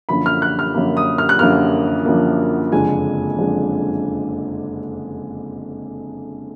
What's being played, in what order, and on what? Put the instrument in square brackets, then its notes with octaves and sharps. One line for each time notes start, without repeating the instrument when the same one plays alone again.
[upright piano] F#2 D3 F3 A#3 B5
F6
F#6
F6
F#2 D3 F3 A#3
D#6
F6
F#6
F#2 D3 F3 A#3 F6
F#2 D3 F3 A#3
F#1 F2 D3 G#3 D4 G#5
F#1 F2 D3 G#3 D4